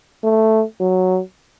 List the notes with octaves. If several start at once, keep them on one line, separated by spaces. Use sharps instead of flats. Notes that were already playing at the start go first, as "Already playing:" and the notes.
A3
F#3